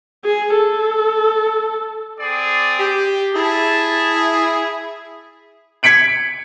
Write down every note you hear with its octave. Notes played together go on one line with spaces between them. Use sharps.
G#4
A4
C4 G#4 D5
G4
E4 G#4 A5
G#6 B6 C#7 D7 F#7